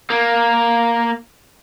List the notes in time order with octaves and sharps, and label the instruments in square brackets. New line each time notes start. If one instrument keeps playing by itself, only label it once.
[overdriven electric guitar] A#3